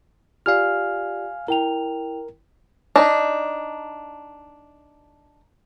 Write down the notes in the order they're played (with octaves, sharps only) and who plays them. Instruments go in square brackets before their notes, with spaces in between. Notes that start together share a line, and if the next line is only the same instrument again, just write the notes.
[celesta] F4 G4 D5 [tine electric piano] F5 G#5 F6
[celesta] E4 G5 F7 [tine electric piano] A#4
[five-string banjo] D4 D#4